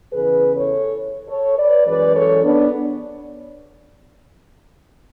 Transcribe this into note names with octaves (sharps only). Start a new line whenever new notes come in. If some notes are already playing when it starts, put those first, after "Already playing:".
E2 C#3 E3 G#4 B4
A4 C#5
A4 C#5
B4 D5
F#2 E3 G#3 B4 D5
A4 C#5
B3 D4